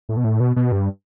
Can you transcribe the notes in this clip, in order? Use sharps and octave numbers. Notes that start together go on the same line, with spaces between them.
A2
B2
A2
B2
B2
G2